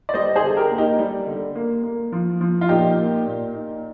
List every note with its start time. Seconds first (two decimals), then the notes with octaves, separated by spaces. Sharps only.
0.09 D5
0.14 G3 C5 D#5
0.36 G#4 C5
0.42 D3
0.57 G4 A#4
0.71 A#3
0.78 D#4 G4
0.99 G3
1.27 D3
1.55 A#3
1.84 A#3
2.12 F3
2.41 F3
2.61 F4
2.69 A#2 D#4 G4
2.97 A#3
3.26 A#2
3.54 D#4